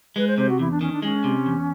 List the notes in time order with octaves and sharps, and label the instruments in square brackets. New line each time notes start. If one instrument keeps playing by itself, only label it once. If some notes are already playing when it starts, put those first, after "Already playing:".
[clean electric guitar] G#3 [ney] B4
[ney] C5
[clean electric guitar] C3 [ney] C5
[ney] F#4
[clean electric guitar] E2 [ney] E4
[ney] D4
[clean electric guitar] D#3 [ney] C#4
[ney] D4
[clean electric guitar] G#3 [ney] C#4
[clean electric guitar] C3
E2